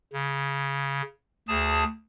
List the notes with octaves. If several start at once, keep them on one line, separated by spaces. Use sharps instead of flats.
C#3
D2 G#4 A5